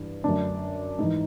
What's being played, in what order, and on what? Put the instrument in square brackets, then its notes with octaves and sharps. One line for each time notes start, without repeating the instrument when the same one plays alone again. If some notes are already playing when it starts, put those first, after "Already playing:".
Already playing: [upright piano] G2 E3
F#2 D3 D4
G#2 E3 D#4